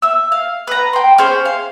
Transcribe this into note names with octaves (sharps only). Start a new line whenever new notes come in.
E5 E6
F5
B4 A#5
G5 C6
C#4 G#4 C5
F5